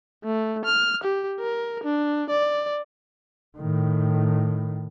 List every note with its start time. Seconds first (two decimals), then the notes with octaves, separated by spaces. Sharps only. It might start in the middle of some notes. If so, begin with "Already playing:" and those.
0.24 A3
0.65 F6
1.04 G4
1.40 A#4
1.84 D4
2.30 D5
3.58 A2 D#3